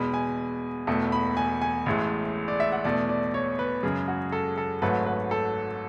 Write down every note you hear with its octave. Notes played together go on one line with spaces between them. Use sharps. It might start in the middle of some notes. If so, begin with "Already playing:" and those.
Already playing: E2 B2 G#3 B5
G#5
E1 E2 B2 A3
B5
G#5
G#5
A1 A2 G#3
D5
E5
F#5
E2 B2 A3 D5
D5
C#5
B4
F#2 C#3 G#3 G#4
F#4
A4
A4
G#1 G#2 F#3 A3 B4
B4
A4